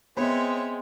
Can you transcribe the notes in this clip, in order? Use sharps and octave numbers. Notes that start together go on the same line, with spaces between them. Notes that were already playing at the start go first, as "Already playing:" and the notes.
G#3 B3 C4 C#5 E5